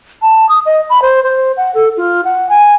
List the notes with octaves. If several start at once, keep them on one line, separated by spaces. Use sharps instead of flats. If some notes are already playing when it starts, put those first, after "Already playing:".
A5
D#6
D#5
B5
C5
C5
F#5
A4
F4
F#5
G#5